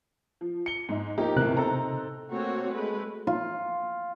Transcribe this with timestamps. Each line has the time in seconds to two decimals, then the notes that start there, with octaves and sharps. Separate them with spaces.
0.41 F3
0.66 C#7 G7
0.89 G#2 D#4
1.18 F3 A#3 D#4 G4
1.37 E2 A2 C3 A#4 F#6
1.57 C4 D#4 A4 A#5
2.29 A3 A#3 C4 F#4 C#5
2.70 G#3 A3 B4
3.27 F4